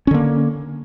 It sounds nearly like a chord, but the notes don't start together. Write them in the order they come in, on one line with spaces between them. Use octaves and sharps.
C#4 D3 A#3